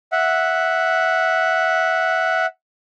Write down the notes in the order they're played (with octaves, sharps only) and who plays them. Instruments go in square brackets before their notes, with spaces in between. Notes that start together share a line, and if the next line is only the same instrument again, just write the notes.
[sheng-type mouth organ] E5 F#5